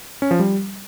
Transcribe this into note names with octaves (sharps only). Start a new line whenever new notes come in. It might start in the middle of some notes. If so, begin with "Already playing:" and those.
C#4
F3
G3